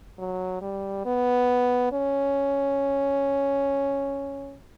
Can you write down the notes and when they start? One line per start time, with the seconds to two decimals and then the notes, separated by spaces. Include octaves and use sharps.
0.18 F#3
0.62 G3
1.05 B3
1.92 C#4